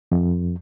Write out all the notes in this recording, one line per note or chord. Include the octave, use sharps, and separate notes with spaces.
F2